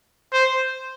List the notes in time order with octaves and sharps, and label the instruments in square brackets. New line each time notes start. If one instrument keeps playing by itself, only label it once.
[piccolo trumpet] C5